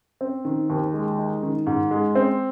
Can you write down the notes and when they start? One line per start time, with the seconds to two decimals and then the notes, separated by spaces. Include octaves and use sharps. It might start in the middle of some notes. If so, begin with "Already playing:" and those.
0.21 C4
0.45 D#3
0.70 D#2
0.93 G#3
1.19 D#4
1.43 D#3
1.67 G#2
1.91 G#3
2.15 C4